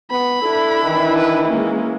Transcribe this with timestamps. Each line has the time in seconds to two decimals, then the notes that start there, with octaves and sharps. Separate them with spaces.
0.11 B3 B5
0.42 D4 E4 A4
0.83 D#3 E3
1.18 B4
1.48 G#3 A#3 C#4